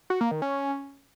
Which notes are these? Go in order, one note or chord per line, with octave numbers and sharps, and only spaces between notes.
F#4
A#3
D#3
C#4